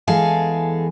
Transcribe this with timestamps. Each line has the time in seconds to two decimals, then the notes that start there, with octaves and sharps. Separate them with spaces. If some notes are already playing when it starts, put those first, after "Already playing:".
0.07 E2 E3 G#3 G#4 A4 F5